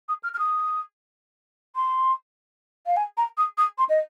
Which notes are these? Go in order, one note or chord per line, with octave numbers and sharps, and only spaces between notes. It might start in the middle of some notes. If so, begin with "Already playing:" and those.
D#6
F6
F6
D#6
C6
F5
G#5
A#5
D#6
D#6
C6
D#5